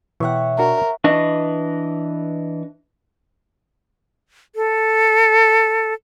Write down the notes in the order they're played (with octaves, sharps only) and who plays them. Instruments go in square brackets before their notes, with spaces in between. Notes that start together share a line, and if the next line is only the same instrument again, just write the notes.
[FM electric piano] B2 G5 [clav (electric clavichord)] E3 [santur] C#5 E5 F#5
[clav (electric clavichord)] D4 F#4 [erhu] A#4
[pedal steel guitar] E3 D4 B4 D#5 C#6
[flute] A4